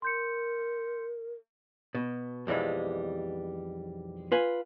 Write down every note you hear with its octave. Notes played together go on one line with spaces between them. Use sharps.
A#4 C6 G6 C#7
B2
B1 F2 E3 G3 G#3
F4 B4 G#5